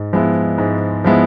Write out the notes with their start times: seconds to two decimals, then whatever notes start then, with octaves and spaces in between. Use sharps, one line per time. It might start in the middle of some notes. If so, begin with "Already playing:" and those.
Already playing: G#2
0.13 F3 G#3 B3 E4
0.58 G#2
1.04 F3 G#3 B3 E4